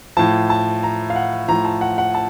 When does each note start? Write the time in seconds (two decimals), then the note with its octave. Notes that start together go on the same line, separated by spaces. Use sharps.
0.17 A2 F3 A5
0.50 A5
0.83 A#5
1.10 F5
1.16 F#5
1.48 A2 F3 A#5
1.65 A5
1.81 F#5
1.98 F#5
2.15 A5